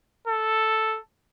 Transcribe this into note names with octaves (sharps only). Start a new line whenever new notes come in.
A4